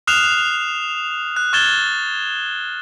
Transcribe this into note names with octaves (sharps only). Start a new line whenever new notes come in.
D#6 F6 F#6 C7 E7 F7
F#6
C#6 F6 G#6 A6 E7 G7